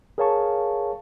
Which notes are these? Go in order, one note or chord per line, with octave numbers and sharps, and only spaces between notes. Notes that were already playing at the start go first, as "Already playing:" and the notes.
G#4 A#4 C#5 F5 A5 C#6